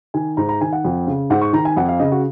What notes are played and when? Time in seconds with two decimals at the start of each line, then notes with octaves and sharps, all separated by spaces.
0.14 D#3 G#5
0.37 G#2 A#5
0.49 A#5
0.61 D#3 G#5
0.73 F#5
0.85 F2
1.07 C#3
1.30 G#2 F#5
1.41 C#6
1.53 D#3 A#5
1.65 G#5
1.77 F2 F#5
1.88 F5
2.00 C#3 D#5
2.12 F#4